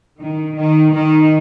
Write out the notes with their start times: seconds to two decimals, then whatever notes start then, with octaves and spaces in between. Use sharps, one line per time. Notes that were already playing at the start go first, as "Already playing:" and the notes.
0.20 D#3
0.56 D#3
0.93 D#3